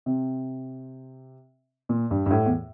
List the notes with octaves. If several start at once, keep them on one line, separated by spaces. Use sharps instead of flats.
C3
A#2
G2
G2
A2
E2